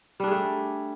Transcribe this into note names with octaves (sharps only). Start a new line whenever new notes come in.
G3 A3 D4 G#4